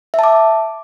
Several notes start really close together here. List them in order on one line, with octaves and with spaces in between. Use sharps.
E5 A5 D6